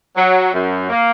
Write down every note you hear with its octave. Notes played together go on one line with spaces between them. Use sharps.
F#3
F#2
A#3